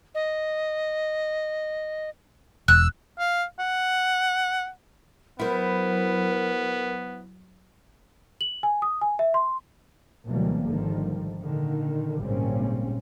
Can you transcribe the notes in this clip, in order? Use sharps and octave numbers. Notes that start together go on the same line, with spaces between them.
D#5
E1 E6 F#6
F5
F#5
F#3 B3 E4 A#4 C5
F#7
G#5
D#6
G#5
E5
C6
D2 B2 E3 F#3 G3 A#3
G#1 D3 D#3 F3 G3
A#2 D3 D#3
G#1 A#2 C#3 G3 C4 C#4